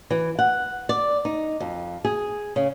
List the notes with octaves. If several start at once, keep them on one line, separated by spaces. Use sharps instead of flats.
E3
F#5
D5
D#4
F2
G#4
C#3